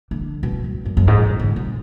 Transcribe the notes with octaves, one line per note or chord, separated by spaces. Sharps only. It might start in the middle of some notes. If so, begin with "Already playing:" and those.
D3
B2
F#2
F#2
F#2
G#2
A#2
D3
B2